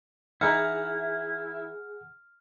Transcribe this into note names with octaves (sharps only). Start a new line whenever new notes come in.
E3 D#4 E4 G#4 F#5 F6